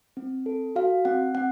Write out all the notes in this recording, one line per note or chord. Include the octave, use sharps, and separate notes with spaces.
C4
A4
F#4 F5
C4 F#5
C4 F#5